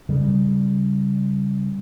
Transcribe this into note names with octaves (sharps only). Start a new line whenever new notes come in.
C#3 G3